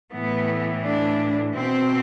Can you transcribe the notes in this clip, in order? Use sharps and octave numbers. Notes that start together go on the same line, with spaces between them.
A2 E3 B3
D4
B2 C4